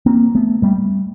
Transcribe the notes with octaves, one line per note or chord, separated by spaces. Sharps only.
A#3 C4
A3 B3
G3 A3